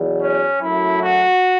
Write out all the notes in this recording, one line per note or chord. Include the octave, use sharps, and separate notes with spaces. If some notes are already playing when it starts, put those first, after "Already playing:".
Already playing: E2 B2 F#3
C#4
F#2 F#3 A3 E4
F#4